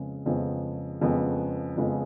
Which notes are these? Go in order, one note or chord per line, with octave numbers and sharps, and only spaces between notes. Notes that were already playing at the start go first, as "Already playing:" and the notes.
Already playing: F2 C#3 G#3 B3
F2 C#3 F3 G#3 B3
F2 C#3 F3 G#3 B3
F2 C#3 F3 G#3 B3